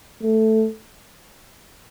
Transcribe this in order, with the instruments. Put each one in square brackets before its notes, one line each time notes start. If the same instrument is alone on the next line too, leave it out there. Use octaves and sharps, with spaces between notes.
[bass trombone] A3